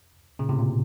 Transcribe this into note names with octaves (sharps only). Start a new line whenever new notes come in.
A#2 C#3
A2 C3
A#2